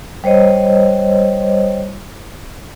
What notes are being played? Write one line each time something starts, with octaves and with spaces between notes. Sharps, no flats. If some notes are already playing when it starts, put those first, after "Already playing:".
G3 C5 C#5 D#5